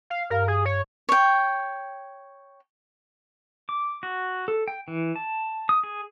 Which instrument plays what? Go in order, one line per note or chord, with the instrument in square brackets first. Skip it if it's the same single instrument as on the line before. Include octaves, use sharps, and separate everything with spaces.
[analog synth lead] F5
[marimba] G2 F5 [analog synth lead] A#4
[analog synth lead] G#4
C#5
[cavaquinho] C#5 G5
[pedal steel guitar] D6
F#4
A4
G5
E3
A5
D#6
G#4